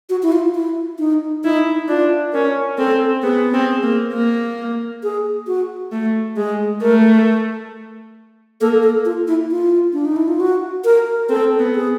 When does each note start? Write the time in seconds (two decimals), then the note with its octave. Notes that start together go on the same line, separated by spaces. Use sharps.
0.10 F#4
0.23 E4
0.32 F4
0.55 E4
0.99 D#4
1.44 D#4 E4
1.89 D4 F4
2.33 C#4 A#4
2.78 C4 A4
3.23 B3 G#4
3.53 C4
3.83 A#3
4.13 A#3
5.03 G#4
5.47 F#4
5.92 A3
6.37 G#3 G#4
6.81 A3 A#4
8.61 A#3 A4
8.83 A4
9.05 F4
9.28 E4
9.51 F4
9.93 D4
10.05 D#4
10.16 E4
10.28 F4
10.40 F#4
10.85 A#4
11.29 C4 A4
11.59 B3
11.75 G#4